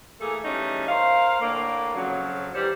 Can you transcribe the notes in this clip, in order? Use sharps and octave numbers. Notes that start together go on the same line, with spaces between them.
E3 A3 A#3 G#4 A4
E2 G3 A3 C#4 D#4
A#4 C5 F5
A2 D3 A#3
F2 C#3 F#3
D#3 E3 G3 C5 C#5